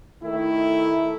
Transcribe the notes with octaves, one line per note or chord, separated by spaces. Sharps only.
D#3 A3 E4